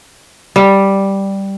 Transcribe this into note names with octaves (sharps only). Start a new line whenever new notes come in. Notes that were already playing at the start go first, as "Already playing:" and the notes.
G3